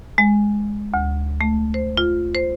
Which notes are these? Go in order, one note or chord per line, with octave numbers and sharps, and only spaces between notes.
G#3
D2
A3
C5
F4
C5